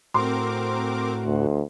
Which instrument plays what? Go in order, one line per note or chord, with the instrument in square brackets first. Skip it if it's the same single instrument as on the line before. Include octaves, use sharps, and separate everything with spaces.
[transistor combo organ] A2 F#4 [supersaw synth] C4 A#4 D6 [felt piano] C6
[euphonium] D2